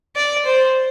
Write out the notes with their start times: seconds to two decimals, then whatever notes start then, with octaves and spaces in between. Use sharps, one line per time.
0.16 D5
0.46 C5